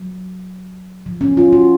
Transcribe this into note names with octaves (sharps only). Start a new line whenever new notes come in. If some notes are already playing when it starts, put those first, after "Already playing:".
Already playing: F#3
F3
C#4
F4
F#4